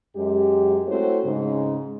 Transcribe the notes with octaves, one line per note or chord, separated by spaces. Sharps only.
F#2 G#3 G4
A3 C4 E4 F#4 C5 C#5
G#2 C#3